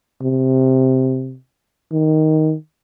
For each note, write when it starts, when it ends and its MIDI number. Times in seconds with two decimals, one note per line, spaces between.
0.22 1.37 48
1.92 2.54 51